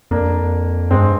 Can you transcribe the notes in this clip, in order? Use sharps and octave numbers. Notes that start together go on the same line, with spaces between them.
F2 A#3 D4
G2 G#3 C4